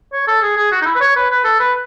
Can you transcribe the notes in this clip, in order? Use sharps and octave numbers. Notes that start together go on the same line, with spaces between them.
C#5
A4
G#4
G#4
F#4
D#4
E4
B4
C#5
B4
B4
A4
B4